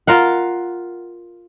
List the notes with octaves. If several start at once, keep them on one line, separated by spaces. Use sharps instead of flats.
F4 A#4 F5 F#5